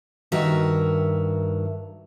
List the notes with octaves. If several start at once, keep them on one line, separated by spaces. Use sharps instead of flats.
G2 D#3 F#4 A#4 E5